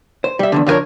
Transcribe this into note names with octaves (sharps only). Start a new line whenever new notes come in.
C5
G3 E5
E2 G2 D3
D3 F3 E4 A#4 C#5